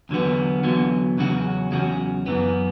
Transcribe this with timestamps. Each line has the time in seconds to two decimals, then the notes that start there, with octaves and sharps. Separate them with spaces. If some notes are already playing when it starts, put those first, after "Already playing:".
0.09 E2 D3 F#3 B3
0.63 E2 D3 F#3 B3
1.18 E2 C#3 F#3 C#4 F#4
1.71 E2 C#3 F#3 C#4 F#4
2.26 F#2 E3 B3